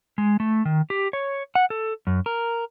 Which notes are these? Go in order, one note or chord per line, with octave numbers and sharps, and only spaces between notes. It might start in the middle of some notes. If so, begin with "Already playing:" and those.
G#3
A3
D#3
G4
C#5
F#5
A4
F#2
A#4